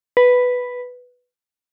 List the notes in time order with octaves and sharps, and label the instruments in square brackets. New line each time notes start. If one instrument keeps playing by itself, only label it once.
[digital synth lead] B4